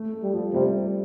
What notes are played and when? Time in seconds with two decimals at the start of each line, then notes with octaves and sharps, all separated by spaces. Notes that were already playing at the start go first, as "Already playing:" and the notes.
Already playing: A3
0.13 A3
0.23 G3
0.33 F3
0.53 C3 G3